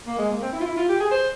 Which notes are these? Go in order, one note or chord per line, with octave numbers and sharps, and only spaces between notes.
A#3
G#3
A#3
C4
E4
F4
E4
F4
G4
G#4
C5